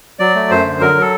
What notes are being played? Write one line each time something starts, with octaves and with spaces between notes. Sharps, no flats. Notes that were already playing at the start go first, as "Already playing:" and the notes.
F#3 D5
A3
F#2 C5
D3
F#3 A#4
F#3
A4